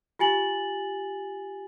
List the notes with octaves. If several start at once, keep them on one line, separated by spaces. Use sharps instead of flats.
F4 G4 G#5 A6 F#7